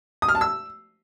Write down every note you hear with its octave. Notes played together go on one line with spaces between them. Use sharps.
D#6
F6
A5
E6